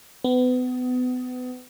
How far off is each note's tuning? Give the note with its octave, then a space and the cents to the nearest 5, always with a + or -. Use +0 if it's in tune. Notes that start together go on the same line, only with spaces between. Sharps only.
B3 +30